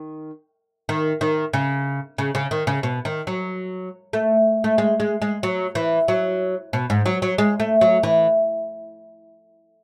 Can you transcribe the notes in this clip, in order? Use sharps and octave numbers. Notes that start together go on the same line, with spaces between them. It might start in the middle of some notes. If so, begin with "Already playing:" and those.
Already playing: D#3
D#3
D#3
C#3
C#3
C#3
D#3
C#3
B2
D#3
F#3
A3
A3
G#3
G#3
G#3
F#3
E3
F#3
B2
G#2
F#3
F#3
G#3
A3
F#3
E3